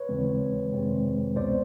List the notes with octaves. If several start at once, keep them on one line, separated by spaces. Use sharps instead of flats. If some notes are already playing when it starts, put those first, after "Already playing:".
Already playing: B4 C#5
D#2 C#3 E3 G#3 C4
F2 C3 D#3 G#3 C4
C#2 B2 G#3 B3 C5 D5